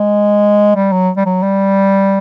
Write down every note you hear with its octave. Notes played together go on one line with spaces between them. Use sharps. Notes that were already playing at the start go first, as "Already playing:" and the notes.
Already playing: G#3
G3
F#3
G3
F#3
G3